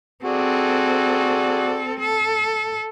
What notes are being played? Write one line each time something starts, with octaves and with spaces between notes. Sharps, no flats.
C4 F#4 G#4 A4 D5
A4